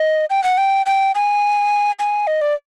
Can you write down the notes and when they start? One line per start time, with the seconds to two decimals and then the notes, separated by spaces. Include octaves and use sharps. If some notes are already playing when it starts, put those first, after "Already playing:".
Already playing: D#5
0.30 G5
0.44 F#5
0.58 G5
0.86 G5
1.15 G#5
1.99 G#5
2.27 D#5
2.41 D5